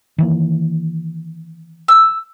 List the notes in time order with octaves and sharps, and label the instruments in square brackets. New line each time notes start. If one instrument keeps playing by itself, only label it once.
[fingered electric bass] D#3 E3 A#3
[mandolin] E6